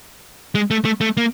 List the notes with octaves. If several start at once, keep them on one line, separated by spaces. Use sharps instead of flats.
G#3
A3
A3
A3
A#3